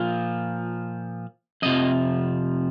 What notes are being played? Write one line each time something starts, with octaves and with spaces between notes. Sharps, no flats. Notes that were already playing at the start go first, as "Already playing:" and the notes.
Already playing: A#2 F3
F2 C3 F3 D#5